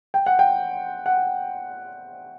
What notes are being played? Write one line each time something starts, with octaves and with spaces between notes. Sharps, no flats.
G5
F#5
G5
F#5